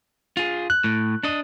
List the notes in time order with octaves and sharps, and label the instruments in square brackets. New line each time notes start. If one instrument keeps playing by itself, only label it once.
[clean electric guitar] F4 G#4
[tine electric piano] F#6
[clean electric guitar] A2
D4 D#5